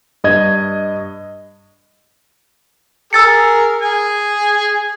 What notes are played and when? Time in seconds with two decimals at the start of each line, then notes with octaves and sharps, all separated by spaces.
0.24 G2 D#5 G#6
3.13 G#4 A#4 E6 A6 C#7
3.82 G#4 G#5